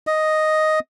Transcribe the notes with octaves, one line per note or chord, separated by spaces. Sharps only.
D#5